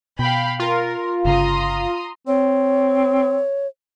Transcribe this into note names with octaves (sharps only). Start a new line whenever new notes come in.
B2 F5 G5 B5
F4 A#4
G1 C#3 A#5 C6 D#6
C4 C#5